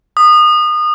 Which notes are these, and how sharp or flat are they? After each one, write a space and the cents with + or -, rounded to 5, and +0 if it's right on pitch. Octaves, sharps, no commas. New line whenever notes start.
D#6 -30